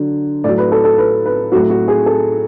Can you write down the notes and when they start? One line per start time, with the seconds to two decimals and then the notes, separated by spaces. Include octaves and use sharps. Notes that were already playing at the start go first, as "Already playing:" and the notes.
Already playing: D3 F#3
0.44 A2 F#3 D5
0.58 B4
0.72 A4
0.84 A4
0.98 B4
1.26 B4
1.52 F#3 F#4
1.55 A2
1.70 F#4
1.88 G#4
2.06 A4